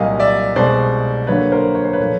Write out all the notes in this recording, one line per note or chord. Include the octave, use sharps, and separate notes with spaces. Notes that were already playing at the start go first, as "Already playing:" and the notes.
Already playing: C2 A#2 F#3 D#5 F5
D5 E5
C2 B2 G#3 B3 C5 D5
D2 D3 F#3 A#3 B4 C#5
A#4 C5
C#5
C5
B4 C#5
A#2 F3 A3